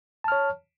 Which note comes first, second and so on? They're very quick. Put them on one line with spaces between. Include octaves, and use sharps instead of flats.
A5 F6 C#5